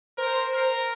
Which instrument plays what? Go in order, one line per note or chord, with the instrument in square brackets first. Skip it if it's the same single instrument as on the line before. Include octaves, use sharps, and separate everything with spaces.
[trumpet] A#4 [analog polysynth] C5
[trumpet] A#4